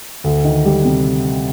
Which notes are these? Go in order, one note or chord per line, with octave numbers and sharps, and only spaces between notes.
D2
D#3
G3
C3